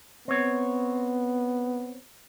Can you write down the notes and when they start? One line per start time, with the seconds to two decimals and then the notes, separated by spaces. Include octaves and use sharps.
0.28 B3 C4 C#5